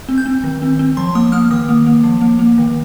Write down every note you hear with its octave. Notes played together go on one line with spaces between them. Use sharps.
C4
G6
C4
D#3
C4
C4
F3 C6
A#3 D#6
A#3 F6
D#3 D#6
A#3
A#3
F3
A#3
A#3
D#3